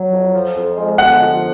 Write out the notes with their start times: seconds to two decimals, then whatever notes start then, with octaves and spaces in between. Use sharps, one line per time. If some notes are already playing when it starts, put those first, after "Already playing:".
Already playing: F#3
0.12 F2
0.34 F3
0.55 F2
0.76 G#3
0.98 D3 F#5
1.20 F3